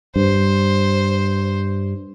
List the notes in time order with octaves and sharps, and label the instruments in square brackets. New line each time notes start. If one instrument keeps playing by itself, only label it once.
[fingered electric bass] G2 [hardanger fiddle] C5